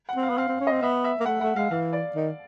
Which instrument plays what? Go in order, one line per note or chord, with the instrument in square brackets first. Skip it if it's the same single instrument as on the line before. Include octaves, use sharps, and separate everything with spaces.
[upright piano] F#5
[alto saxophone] C4
[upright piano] F5
[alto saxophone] B3
[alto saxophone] C4 [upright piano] F5
[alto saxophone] C4
C#4
[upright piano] D#5
[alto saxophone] C4
[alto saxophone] B3 [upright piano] E5
[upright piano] E5
[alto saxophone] A#3
[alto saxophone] A3 [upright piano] F#5
[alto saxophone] A3 [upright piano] F#5
[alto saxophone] G#3 [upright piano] F5
[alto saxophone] E3 [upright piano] F5
[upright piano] D5
[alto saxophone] D#3